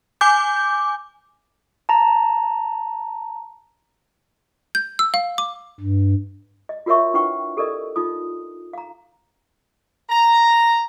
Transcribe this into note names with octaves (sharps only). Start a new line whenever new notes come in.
G#5 D6 G6
A5 A#5
G6
E6
F5
D6
G2
D#5
F4 F#4 A#4 C#5 E5 C#6
D4 E4 B4 F#5 G5 C#6
G4 A4 A#4 D5 D#5
D#4 F4 D#6
F5 A#5
A#5